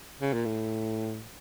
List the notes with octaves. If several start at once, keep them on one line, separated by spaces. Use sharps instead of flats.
C#3
A#2
A2